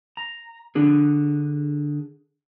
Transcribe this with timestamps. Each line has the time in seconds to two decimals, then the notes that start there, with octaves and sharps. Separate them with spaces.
0.17 A#5
0.75 D3 D4 G#4